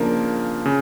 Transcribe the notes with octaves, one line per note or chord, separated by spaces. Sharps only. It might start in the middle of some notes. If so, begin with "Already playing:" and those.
Already playing: C#3 F3 A#3 D4 A#4
C#3